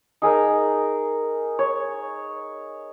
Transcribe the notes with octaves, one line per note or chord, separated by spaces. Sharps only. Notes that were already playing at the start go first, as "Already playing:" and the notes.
D#4 G#4 A#4 A#5
C#5